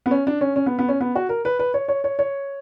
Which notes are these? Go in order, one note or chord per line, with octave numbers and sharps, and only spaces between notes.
B3
C#4
D4
C#4
C#4
B3
B3
C#4
B3
F#4
A#4
B4
B4
C#5
C#5
C#5
C#5